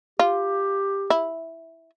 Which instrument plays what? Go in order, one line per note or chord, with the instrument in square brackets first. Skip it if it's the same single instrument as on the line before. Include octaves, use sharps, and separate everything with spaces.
[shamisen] F4 [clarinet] G4
[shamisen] E4